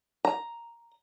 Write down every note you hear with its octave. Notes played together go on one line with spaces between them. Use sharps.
A#5